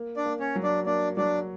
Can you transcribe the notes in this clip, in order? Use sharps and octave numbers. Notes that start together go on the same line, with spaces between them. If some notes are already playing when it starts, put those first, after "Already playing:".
Already playing: A#3
D4 D5
A#3
C#4 C#5
F#3
D4 D5
A#3 D4 D5
F#3 D4 D5